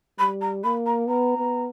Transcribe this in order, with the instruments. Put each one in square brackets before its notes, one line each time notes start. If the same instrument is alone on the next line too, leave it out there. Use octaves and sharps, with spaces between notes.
[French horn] G3 [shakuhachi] B5
[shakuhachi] A#5
[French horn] A#3 [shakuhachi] B5
[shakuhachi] A#5
[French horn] B3 [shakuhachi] A#5
[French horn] B3